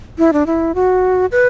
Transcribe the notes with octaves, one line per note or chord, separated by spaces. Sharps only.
E4
D4
E4
F#4
B4